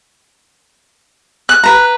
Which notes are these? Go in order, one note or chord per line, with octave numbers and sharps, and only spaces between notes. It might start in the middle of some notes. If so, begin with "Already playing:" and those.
F#6
B4 A#5